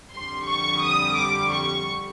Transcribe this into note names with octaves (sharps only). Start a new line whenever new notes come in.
F2 D3 G3 C6
C#6
D#6
D6
C#6